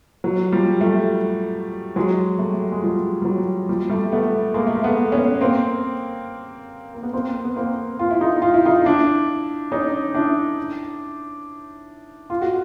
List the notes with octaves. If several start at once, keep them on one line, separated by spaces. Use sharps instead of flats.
F#3
F3 G3
G3 A3
F#3 G#3
G3 A3
G#3
F3 G3
G3
F#3
F3 G3
G3 A3
A3 B3
G#3 A#3
A3
A#3
A3 B3
B3 C#4
A#3 C4
A#3
B3
A#3 C4
B3
A#3 C4
F4
E4
D#4 F4
F4
E4
D#4 F4
D4 E4
C#4 D#4
D4 E4
F4
F#4